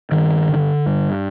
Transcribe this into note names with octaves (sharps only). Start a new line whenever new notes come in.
G2 D#3
D3
G2